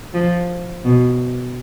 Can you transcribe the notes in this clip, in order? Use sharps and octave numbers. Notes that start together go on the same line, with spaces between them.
F3
B2